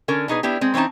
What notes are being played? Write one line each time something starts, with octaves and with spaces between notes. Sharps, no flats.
D3 C#4 A#4
B2 D#4 G#4 B4
B3 D4 E4 G4
G#3 C4
E3 C4 C#4 D#4 A5